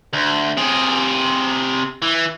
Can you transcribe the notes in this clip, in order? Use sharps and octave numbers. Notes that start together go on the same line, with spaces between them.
D2
C3 G#4
E3